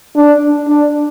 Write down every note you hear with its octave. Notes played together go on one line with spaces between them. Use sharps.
D4
D4